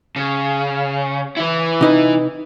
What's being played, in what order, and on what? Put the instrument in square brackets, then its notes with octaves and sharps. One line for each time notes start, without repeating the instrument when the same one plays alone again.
[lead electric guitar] C#3
E3 E4
[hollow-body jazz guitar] C3 D#4 B4